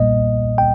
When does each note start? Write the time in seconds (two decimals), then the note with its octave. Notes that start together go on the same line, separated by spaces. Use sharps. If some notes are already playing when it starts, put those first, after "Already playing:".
Already playing: B1 A#2 G3 A#3 D#5
0.58 G5